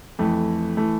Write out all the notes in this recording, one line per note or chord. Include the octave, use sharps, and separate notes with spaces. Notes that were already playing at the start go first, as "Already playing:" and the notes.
F2 E3 A3
E3 A3